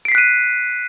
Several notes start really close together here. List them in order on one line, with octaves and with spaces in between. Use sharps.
D7 C7 B6 F#6 D#7